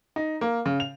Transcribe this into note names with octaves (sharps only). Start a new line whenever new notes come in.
D#4
A#3
C#3
F7